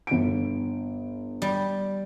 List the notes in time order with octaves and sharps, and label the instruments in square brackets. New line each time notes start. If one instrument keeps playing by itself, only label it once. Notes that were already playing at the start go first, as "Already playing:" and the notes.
[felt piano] G1 D7
[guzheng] G3